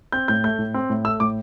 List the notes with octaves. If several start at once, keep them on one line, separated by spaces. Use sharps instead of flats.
C4 G6
A2 G6
A3 G6
A2
C4
A2
A3 E6
A2 D6